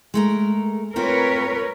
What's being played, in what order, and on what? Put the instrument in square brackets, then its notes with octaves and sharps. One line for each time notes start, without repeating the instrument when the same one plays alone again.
[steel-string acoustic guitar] G#3 A3 A#4
[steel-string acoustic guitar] A3 C4 F4 [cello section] A#4 B4 C#5